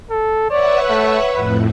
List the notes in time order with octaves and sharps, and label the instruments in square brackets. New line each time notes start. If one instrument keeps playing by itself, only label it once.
[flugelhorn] A4
[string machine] B4 E5 F#5 [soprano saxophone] C#5 [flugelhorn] D5
[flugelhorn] A3
[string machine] F2 A2 [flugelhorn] B4